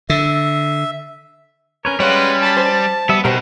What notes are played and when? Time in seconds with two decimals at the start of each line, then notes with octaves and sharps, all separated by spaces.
0.10 D3 E5
1.85 C#4 A#4 B4 C#5
2.00 G3 G#3 C#4 B4 C#5 F5 F#5
2.42 F#3 A5 B5
2.57 C5 A5
3.09 G3 B3 E5
3.25 B2 G3 D#4 G4 A#4 C5